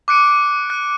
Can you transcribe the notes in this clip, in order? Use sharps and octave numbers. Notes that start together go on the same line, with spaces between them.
D6 F#6 C#7 D7
F#6